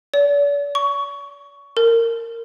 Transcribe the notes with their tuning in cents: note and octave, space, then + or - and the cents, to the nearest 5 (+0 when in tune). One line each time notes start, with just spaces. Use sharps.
D5 -40
C#6 +15
A#4 -20